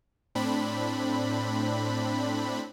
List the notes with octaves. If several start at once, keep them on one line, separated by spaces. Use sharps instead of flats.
A2 C4 D4 B5